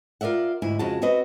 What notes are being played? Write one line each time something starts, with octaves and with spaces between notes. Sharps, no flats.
F4 A#4 D5 E5 F#5
D2 G#2 E4
F2 C#3 G#3 F#4 A5
C4 F#4 B4 D#5